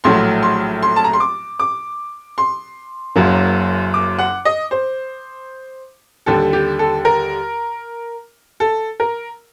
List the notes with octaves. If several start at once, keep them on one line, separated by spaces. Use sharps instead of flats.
A#1 A2 F#3 A3 C6
C6
C6
A5
A#5
C6
D6
D6
C6
F#1 F#2 F#3 A#3
D6
F#5
D#5
C5
D#2 D3 G3 A4
G4
A4
A#4
A4
A#4